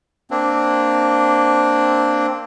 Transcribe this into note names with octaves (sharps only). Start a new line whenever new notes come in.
A#3 C4 D4